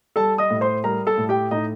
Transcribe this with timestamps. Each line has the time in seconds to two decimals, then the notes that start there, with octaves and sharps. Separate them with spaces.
0.16 G3 A4 A5
0.38 D#5 D#6
0.50 A2
0.61 C5 C6
0.84 G3 A#4 A#5
1.07 A4 A5
1.18 A2
1.29 G4 G5
1.51 A2 D#4 D#5